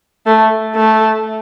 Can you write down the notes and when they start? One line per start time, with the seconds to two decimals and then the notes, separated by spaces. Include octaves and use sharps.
0.26 A3
0.75 A3